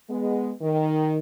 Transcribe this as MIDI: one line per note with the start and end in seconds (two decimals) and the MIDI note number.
0.10 0.52 56
0.10 0.52 59
0.62 1.19 51